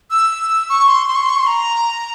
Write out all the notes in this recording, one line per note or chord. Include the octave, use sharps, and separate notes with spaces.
E6
C#6
C6
C6
C#6
C6
C#6
C6
A#5